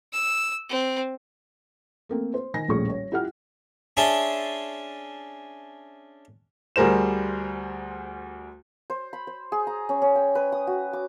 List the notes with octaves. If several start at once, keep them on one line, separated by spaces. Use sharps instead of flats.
E6
C4
A3 A#3 C4
C5
D#3 G#5 A#6
D#1 A#1 A2 C#4 G#4 C#6
C#5
E4 F4 G4 F#5 F6
C#4 D4 G#4 E5 A5 C6
D2 G3 G#4 A#4 C5 E7
C5
B5
C5
G#4
A#5
C#4
C#4
G5
B4
D#6
F#4
D6